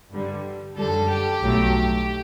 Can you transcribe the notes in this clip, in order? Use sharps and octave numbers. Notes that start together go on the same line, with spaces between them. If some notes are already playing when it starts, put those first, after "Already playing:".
G2 D3 G3
F#2 D3 G3 A4
G4
B1 A2 F#3 A3